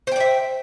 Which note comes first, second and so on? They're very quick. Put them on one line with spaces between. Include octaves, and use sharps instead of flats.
C5 G5 D5 E5